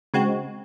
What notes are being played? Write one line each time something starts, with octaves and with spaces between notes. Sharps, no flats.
C#3 G#3 C4 F#4